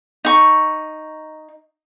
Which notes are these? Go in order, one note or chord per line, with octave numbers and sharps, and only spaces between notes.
D#4 C#6